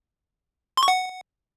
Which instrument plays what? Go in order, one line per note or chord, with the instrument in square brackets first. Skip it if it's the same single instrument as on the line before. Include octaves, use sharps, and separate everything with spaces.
[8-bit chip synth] C6
C#6
F#5